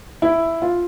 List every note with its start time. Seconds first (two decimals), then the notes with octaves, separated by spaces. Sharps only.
0.22 E4
0.62 F4